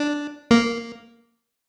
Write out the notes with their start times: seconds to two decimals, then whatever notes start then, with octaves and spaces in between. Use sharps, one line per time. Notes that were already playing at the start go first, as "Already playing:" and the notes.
Already playing: D4
0.51 A#3